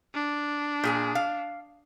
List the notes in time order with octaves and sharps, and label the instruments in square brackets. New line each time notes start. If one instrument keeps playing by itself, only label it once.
[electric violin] D4
[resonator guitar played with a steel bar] A#2 G#4 G#5
F5